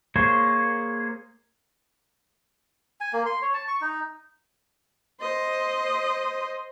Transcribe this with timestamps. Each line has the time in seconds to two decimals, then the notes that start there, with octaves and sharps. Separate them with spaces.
0.16 A#3 G#4 C5 C#5
3.01 G#5
3.13 A#3
3.26 C6
3.42 C#5
3.54 A5
3.68 C#6
3.81 D#4
5.20 C5 D#5